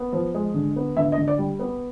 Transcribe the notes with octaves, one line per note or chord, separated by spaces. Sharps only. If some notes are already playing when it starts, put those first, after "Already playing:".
Already playing: B3
F3
G#3
D3
B3
D3 E5
D#5
D3
D5
G3
B3